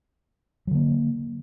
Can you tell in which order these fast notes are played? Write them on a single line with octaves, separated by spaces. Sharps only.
F#3 D3 A#3